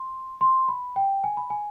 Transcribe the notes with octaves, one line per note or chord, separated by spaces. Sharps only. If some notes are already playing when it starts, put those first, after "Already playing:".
Already playing: C6
C6
B5
G5
G#5
B5
G#5